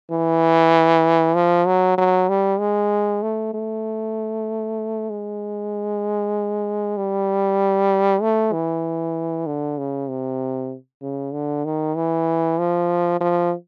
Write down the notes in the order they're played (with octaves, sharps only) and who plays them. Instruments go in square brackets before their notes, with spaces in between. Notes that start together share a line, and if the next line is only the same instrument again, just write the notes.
[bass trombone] E3
F3
F#3
F#3
G3
G#3
A3
A3
G#3
G3
A3
E3
D3
C#3
C3
C#3
D3
D#3
E3
F3
F3